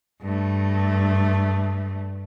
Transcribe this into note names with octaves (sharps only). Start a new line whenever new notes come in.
G2 A3